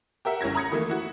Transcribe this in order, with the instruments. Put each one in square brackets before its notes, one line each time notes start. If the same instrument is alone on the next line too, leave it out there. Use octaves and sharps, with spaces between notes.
[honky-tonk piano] G4 A#4 E5 F#5
G1 C#4 E4 G#6 A#6
A#5 B5 D#6 G#6 A#6 C#7
D#3 E3 A3 A#3
E4 F#4